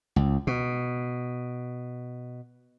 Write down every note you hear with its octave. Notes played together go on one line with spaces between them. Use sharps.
C#2
B2